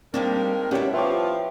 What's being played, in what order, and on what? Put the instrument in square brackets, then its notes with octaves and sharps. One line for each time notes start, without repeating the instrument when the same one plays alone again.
[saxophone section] D#3 G#3 A#4 [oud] G3 A#3 D4 [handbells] C4
[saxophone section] B2 D#3 G3 [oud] B3 E4 [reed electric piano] C#4 G4 C#5
[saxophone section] F3 F4 [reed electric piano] B4 C#5 C#6 [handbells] E5 G5 D6